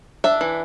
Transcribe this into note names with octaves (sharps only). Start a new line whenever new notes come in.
D4 E5
E3